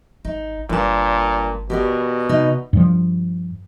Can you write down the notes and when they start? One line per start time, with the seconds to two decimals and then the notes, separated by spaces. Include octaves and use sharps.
0.25 G#1 D#4
0.70 G1 G2 A#2 A5
1.70 B2 G4 A#4 D5
2.29 C3 D#4
2.73 G2 F3